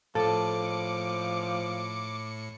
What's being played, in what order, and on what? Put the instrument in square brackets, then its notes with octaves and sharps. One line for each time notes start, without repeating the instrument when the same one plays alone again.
[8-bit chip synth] A2 C#7 [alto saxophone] F3 [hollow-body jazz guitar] A4 [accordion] D6